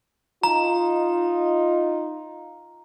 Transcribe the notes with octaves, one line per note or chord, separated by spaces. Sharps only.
D#4 F4 A#5